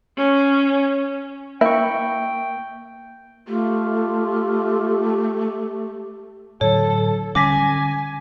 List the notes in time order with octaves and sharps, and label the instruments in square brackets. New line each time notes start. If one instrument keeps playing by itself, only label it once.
[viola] C#4
[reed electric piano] A#3 C#6 [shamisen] E4 [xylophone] E5 [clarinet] G5
[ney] A3 [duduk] F4 [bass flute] G4
[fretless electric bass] A2 D3 F#3 [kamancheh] A4 [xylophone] C#5
[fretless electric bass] D3 G3 C#4 [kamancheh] G#5 [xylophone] D6 A#6 B6